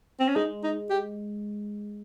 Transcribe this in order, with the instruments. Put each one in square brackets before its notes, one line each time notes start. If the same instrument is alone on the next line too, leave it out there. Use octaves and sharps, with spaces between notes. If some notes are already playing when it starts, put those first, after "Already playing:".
[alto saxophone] C4
C#4
[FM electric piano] G#3 [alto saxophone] D#4
[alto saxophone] D#4
G4